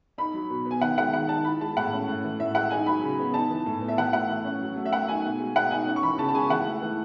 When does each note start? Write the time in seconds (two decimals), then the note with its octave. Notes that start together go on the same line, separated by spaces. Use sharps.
0.18 D#4 B5
0.34 F#3
0.50 B2
0.66 B3
0.71 G#5
0.81 D#3 F#5
0.98 G#3 F#5
1.13 D#3 F#5
1.29 D#4 A5
1.44 E4 B5
1.61 G#3 A5
1.77 A2 F#5
1.93 C#4
2.08 A2
2.24 E3
2.39 A2 E5
2.55 G#3 F#5
2.71 D#4 G#5
2.86 F#3 B5
3.03 C#3
3.19 B3
3.34 D#4 A5
3.50 E3
3.66 A2
3.81 B3
3.88 E5
3.98 E3 F#5
4.13 A3 F#5
4.29 E3
4.44 C#4
4.61 F#3
4.76 A3
4.86 E5
4.92 F#3 F#5
5.08 D#4 G#5
5.24 B2
5.40 G#3
5.56 B2 F#5
5.71 D#4 G#5
5.87 C#4
5.96 C#6
6.03 E3 B5
6.18 C#3 A5
6.28 A5
6.34 G#3 G#5
6.50 E3 F#5
6.66 A3
6.82 E3